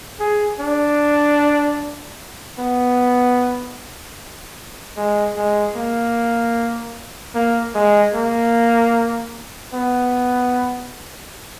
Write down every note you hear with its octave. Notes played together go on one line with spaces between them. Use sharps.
G#4
D4
B3
G#3
G#3
A#3
A#3
G#3
A#3
B3